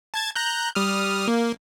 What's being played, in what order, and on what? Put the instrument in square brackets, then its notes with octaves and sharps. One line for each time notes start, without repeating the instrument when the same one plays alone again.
[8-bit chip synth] A5 G#6 A6
A#5 F#6 G6
G3 D#6 F6
A#3